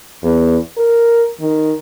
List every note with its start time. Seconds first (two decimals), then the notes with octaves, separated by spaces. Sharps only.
0.23 E2
0.77 A#4
1.40 D#3